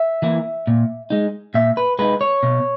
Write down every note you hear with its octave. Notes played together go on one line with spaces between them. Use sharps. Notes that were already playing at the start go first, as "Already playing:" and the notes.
Already playing: E5
E3 A#3 E4
A#2
G#3 D#4
A#2 E5
B4
G#3 D#4 B4
C#5
B2